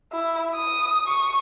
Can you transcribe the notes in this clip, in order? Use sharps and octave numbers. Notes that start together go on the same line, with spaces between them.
E4
D#6
C#6